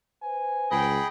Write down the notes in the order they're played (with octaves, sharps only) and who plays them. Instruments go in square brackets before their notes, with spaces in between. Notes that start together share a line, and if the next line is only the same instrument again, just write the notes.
[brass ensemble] B4 C5 G#5
[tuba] C#2 [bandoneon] G#4 B5 [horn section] D#5 F#5 G5